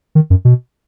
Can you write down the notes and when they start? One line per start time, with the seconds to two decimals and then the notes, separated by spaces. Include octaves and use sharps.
0.15 D#3
0.30 F#2
0.45 B2